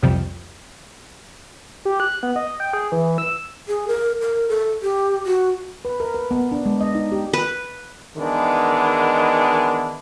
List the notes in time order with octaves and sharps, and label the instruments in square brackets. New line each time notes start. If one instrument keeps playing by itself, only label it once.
[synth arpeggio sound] C2 F2 C3 F3 G3
[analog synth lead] G4
F#6
B3
D#5
G5
G#4
E3
E6
[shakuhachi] G#4
A#4
A#4
A4
G4
F#4
[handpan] B4
A#4
B4
B3
D4
G#3
D#5
D#4
G4
[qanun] B4
[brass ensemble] D#3 E3 G#3 B3 D4